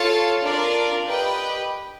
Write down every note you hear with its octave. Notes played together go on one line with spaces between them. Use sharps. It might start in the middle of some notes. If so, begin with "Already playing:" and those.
Already playing: F4 A4 C#5 F5 A5
D4 F4 A#4 D5
G4 B4 D#5 G5